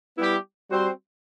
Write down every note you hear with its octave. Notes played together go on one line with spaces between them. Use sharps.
G3 B3 E4 G4
G3 C4 F#4 C5